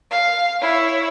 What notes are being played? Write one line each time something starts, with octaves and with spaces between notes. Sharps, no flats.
F5
E4 C#5